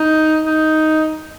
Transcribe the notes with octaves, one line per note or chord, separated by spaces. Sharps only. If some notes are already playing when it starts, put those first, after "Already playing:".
Already playing: D#4
D#4